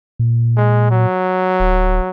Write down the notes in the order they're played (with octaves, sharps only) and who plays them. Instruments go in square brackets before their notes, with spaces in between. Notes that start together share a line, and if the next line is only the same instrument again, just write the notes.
[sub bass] A#2
[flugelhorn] G#3
F#3
[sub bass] D1